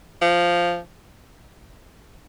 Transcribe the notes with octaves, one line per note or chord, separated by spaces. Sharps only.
F3